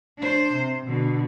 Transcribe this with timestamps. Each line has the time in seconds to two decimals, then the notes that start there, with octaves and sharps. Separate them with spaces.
0.18 D4 C5
0.53 C3
0.85 B2 D3